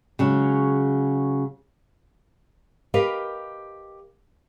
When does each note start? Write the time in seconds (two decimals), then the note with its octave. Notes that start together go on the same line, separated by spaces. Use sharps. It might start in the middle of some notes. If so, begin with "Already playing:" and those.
0.19 C#3 F#3 G#3
2.94 G4 A#4 B4 D#5 F5